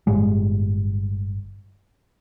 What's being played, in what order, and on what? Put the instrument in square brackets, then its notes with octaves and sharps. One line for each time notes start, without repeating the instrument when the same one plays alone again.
[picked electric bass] G1 A2 G3 G#3